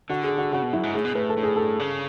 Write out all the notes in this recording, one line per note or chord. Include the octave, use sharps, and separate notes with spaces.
D3 F#4
G#4
F#4
C#3 F#4
B2
F#2 E4
G#2
A2 G#4
B2
A2 B4
A4
A2
G#4
A4
C#3